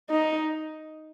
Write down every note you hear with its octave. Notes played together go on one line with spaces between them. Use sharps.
D#4